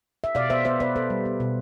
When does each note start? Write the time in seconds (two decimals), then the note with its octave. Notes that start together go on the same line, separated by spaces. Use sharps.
0.24 E5
0.35 B2 D5 F5
0.50 B3 C5 E5
0.65 B3 C5 E5
0.80 B3 B4 D5
0.95 B3 A4 C5
1.10 G3
1.25 B3
1.40 B2